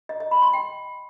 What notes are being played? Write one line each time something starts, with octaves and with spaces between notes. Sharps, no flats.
D#5
D#5
B5
C6
G5